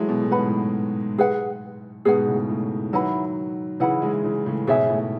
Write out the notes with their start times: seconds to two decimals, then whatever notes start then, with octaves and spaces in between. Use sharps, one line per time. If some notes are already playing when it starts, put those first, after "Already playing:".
Already playing: E3 F#3 G#3 A3
0.09 B2
0.22 A2
0.31 G#2 B4 F#5 B5
0.47 A2
1.18 G#4 B4 F#5
2.05 G#2 B2 G#4 B4 F#5
2.27 A2 C#3
2.49 A2
2.93 D#3 F#3 E4 B4 F#5 B5
3.80 C#3 E3 E4 B4 F#5 B5
4.02 E3 G#3
4.24 C#3 E3
4.46 A2 C#3
4.67 G#2 B2 G#4 C#5 E5 G#5
4.89 A2